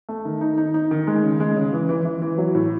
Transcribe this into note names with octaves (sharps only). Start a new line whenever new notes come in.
A3
D#3
D#4
D#4
D#4
D#3
G#3
C#3
G#3
C#3
E3
E3
E3
E3
F#3
A2